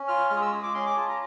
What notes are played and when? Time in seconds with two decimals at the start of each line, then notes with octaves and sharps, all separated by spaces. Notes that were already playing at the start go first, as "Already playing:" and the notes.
Already playing: C#4
0.08 F4 F6
0.30 G#3 F6
0.37 D#6
0.42 E6
0.52 G#4 D#6
0.63 D6
0.74 C#4 C6
0.86 D6
0.97 F4 A5
1.08 A#5